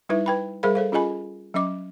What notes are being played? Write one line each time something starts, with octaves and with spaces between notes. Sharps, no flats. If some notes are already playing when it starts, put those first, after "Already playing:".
G3 D#4 E4 B4 E5
B4 G5 B5
G3 G#4 A#4 C5 F5 B5
A4 C5 F5
C#4 F4 G#4 D#5 G#5 B5
F#3 C#4 D#5 D6